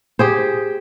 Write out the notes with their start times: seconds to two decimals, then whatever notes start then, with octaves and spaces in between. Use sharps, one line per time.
0.19 G4 G#4 C5